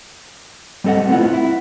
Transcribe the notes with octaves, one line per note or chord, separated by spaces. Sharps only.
G3 C4 A4 D#5 F#5
A3 B3 C4 E4 F4 F#5
E4